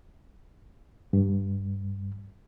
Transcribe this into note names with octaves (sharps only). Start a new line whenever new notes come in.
G2